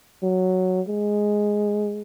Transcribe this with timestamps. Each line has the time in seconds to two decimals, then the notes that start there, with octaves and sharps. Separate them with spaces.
0.23 F#3
0.88 G#3